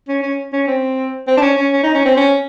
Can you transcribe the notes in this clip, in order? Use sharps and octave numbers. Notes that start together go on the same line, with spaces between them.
C#4
C#4
C#4
C4
C4
D4
C#4
C#4
C#4
D#4
C#4
C4
C#4